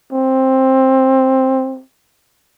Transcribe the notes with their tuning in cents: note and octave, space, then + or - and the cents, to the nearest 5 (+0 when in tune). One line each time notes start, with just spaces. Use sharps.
C4 +10